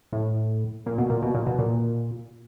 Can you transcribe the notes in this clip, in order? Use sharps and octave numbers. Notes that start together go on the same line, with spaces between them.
A2
A#2
B2
A#2
B2
A#2
B2
A#2